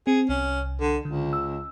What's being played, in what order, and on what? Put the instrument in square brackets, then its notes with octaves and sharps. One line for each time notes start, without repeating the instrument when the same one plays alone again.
[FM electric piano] C4 [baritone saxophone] G#4
[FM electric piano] C2 [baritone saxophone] C#4
[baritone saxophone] D3
[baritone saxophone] C#2 [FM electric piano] D3
[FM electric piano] E6